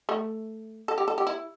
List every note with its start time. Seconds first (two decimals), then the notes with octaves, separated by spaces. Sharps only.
0.09 A3
0.88 A4
0.98 G4
1.08 A4
1.18 G4
1.27 E4